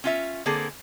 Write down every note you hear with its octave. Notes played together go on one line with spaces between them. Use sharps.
C#4 F4 E5
D3 A#3 C4 G#4 A4